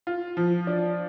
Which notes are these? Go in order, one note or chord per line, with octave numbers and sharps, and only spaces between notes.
F4
F3
D4